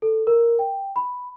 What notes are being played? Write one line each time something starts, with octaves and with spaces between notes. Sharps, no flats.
A4
A#4
G5
B5